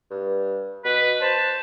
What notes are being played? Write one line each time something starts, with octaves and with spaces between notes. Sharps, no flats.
G2
B2 B4
C5 A5